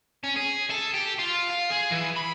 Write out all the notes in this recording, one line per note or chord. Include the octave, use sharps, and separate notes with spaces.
C#4
G#4
A4
G4
F4
F5
G#4
E3
B5